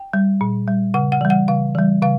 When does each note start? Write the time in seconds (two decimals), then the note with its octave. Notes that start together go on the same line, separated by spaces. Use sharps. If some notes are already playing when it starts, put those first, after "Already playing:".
Already playing: G5
0.13 G3
0.41 A#2
0.67 G3
0.94 C#3 F#5
1.12 F#5
1.21 E3 G3
1.30 F#5
1.48 C#3 F5
1.75 E3 G3
2.02 C#3 F5